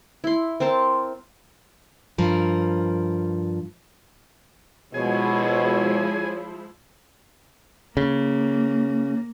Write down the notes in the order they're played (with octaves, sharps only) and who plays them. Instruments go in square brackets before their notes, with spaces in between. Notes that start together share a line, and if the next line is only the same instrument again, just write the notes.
[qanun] E4 C6
C4 A#4 C5 A5
[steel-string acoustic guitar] G2 F3 A#4
[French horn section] B2 [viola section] F3 G#3 E4 [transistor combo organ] G#4 G#5 [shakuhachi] C#5
[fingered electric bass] C#3 [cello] A#3